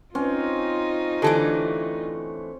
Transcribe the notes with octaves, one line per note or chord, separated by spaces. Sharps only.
C4 C#4 D#4 F4
D3 E3 A3 G4 A4 A5